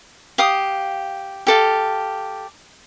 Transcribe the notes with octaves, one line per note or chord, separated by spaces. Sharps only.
G4 F5 D#6
G4 A4 F5